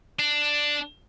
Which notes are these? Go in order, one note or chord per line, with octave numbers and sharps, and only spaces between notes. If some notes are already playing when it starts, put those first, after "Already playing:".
D4